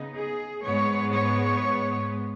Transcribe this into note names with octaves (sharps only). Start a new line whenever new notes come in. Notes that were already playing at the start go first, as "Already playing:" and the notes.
Already playing: C#3 B3 D#4
G#4
G#2 G#3 B3 C#5
C#5